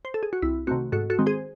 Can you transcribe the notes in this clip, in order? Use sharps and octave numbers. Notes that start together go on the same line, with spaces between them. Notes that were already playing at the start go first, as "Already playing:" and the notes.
C5
A4
G#4
F#4
C2 E4
C3 D#3 A3 C4 F#4
G#2 F#4 A4
F#4 A4
D#3 G#3 C4
G#4 C5